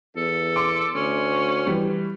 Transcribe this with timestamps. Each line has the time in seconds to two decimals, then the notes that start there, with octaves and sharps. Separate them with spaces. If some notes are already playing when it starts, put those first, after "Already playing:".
0.16 E2 A4
0.56 C6 D6
0.95 D2 C#4
1.67 E3 G3